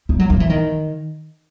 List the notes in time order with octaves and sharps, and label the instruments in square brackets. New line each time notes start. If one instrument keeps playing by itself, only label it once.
[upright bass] G3
F#3
F3
E3
D#3